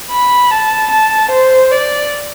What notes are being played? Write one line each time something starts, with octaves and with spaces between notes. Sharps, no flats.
B5
A5
A5
C5
D5